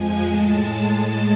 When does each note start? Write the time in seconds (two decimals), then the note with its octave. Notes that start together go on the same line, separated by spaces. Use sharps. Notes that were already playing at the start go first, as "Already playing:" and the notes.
Already playing: F2 F3 G#3 G#5
0.24 A2 G#3 A5